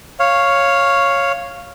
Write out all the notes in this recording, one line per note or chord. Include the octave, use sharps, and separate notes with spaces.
C#5 F5